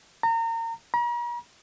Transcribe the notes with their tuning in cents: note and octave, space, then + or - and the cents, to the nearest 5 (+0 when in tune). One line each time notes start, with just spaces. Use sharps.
A#5 -30
A#5 +45